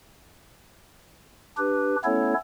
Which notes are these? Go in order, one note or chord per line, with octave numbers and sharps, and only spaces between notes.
D4 G4 B4
A3 B3 C#4 E4 A4 C#5